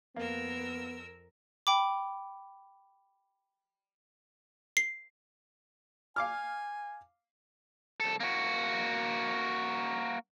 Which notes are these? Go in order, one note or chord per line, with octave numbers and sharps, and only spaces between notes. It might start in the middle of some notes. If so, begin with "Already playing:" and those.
F2 A#3 B3 A#4 E6
G5 B5 D6
C7
F5 G#5 D6 F6
C2 A4
A#3 F#4